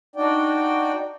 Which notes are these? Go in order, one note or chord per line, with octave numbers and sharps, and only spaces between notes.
D4 D#4 F#4 D5 G5